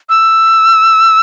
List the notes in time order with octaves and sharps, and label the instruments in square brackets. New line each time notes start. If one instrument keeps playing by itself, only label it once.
[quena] E6